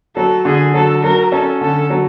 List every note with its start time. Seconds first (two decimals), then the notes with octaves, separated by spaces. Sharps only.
0.16 F#3 A4
0.45 D3 G#4
0.74 F#3 A4
1.04 F#3 A#4
1.32 C#4 A4
1.61 D3 A4
1.90 F#3